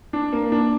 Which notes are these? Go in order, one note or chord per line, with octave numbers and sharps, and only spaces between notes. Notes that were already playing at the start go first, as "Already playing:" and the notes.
D4
A#3
D4